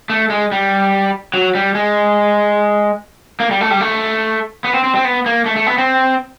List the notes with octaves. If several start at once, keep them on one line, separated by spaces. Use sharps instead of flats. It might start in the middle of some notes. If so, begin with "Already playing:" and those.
A3
G#3
G3
F#3
G3
G#3
A#3
G3
A3
G3
A3
B3
C4
C4
C4
B3
A#3
A3
A3
B3
C4